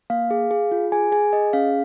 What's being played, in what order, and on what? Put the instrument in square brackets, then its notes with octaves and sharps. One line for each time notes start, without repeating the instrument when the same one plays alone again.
[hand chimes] A#3 F5
G#4
G#4
F4
G#4 G#5
G#4 G#5
G#4 D#5
C#4 F5